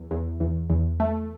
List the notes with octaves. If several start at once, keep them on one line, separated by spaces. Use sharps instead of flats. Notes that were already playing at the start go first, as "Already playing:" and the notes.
Already playing: E2
E2
E2
E2
A3